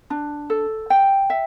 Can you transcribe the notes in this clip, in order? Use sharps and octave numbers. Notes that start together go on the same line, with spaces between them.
D4
A4
G5
E5